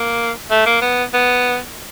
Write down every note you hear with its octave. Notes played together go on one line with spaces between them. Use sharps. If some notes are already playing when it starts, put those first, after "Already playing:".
Already playing: A#3
A3
A#3
B3
B3